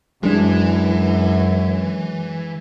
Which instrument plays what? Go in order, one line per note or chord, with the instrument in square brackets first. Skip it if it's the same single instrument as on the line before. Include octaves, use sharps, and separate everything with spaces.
[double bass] F#2 [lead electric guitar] E3 [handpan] F#3 D4 [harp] G#3